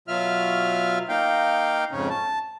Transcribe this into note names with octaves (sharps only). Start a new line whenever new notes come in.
B2 F#3 F4 E5 F6
A#3 D#4 F5 G5
F2 G#2 C#3 C#4
A5